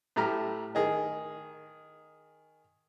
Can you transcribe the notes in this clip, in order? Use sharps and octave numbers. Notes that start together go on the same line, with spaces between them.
A2 A3 G4 A#5 F6
D#3 G#4 D#5